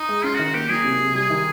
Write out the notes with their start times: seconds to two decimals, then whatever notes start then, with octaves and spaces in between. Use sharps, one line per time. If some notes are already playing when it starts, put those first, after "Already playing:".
Already playing: D#4
0.09 G#3
0.24 C#4 F4
0.34 F#4
0.39 D#3
0.45 F#4
0.54 A#3 G4
0.69 F#3 G#4
0.84 C3
1.00 C3
1.15 G3 G#4
1.30 D#3